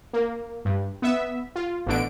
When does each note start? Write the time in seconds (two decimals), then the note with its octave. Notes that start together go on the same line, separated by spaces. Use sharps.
0.13 A#3
0.65 G2
1.02 B3 E5
1.56 F4
1.86 A1 B2 D3 D7